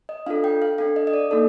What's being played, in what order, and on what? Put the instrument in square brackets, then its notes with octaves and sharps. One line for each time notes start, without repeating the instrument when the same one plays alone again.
[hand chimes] D#5
D4 F4 A4 F5
G5
F5
D4 A4 F5
D#5
D#5
D5
A#3 D#4 A4